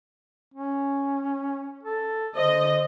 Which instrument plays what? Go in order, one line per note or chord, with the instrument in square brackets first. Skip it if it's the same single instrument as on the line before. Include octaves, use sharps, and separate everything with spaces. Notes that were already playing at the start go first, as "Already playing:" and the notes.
[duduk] C#4
A4
[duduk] D3 [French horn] C5 [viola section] D#5